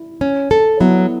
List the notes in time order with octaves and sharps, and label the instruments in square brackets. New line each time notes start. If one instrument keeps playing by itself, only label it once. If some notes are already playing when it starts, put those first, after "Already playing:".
Already playing: [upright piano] E4
[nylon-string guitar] C#4
A4
[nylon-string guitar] F#3 [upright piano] B3 E4